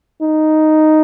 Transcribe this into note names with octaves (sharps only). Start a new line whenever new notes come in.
D#4